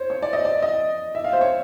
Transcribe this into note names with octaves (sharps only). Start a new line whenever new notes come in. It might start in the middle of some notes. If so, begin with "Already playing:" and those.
Already playing: C5 C#5
C#5
D5
D#5
D5
D#5
E5
F5
C5
C#5